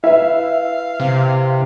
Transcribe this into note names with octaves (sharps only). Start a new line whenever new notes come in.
E4 B4 E5 F5
C3